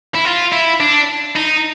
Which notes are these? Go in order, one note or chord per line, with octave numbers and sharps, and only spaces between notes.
E4
F4
E4
D4
D#4